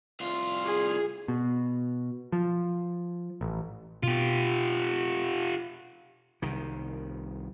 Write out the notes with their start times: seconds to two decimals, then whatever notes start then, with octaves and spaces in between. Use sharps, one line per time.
0.20 C2 F4
0.64 G#4
1.28 B2
2.32 F3
3.41 A1
4.03 B2 B3 F4 G4
6.42 C2 D#3